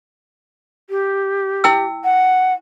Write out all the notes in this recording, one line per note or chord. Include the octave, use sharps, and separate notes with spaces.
G4
E4 G5 E6
F#5